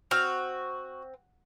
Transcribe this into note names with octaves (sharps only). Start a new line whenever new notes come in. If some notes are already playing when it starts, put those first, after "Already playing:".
C4 F#4 F6